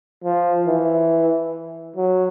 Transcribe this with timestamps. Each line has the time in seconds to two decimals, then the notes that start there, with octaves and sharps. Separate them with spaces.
0.24 F3
0.67 E3
1.96 F#3